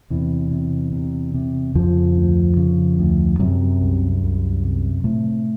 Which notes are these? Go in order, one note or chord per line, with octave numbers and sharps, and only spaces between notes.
E2 C3 E3
C3
C3
C3
F2 C#3 F3
D2
C#3
D2
F#2 C3 F#3
C2
C2
C3
A2 C3 A3